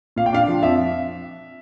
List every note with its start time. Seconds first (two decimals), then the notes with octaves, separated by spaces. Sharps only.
0.16 A#2 F5
0.26 G5
0.33 D4 F5
0.48 F3
0.63 F2 E5